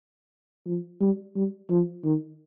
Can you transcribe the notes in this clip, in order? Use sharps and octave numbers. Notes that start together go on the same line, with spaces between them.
F3
G3
G3
F3
D#3